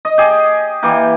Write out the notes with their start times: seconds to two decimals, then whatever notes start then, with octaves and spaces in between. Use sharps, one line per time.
0.05 D#5
0.18 G4 G#4
0.83 E3 A#3 G4